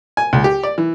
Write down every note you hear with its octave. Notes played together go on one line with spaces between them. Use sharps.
G#5
C#2
G4
D5
E3